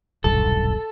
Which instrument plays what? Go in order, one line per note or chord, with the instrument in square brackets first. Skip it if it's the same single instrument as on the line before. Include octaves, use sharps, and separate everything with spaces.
[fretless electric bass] D#1 B1 G2 [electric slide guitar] A4